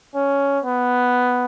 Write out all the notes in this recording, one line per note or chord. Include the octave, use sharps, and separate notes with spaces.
C#4
B3